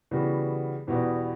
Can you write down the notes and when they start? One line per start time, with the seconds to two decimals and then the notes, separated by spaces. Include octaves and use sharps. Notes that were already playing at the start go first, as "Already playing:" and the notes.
0.11 C#3 E3 G3 B3 F#4
0.87 E2 B2 G3 B3 F#4